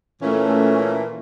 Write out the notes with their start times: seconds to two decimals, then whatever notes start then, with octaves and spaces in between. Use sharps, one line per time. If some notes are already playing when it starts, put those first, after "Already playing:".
0.21 A#2 E3 A3 C#4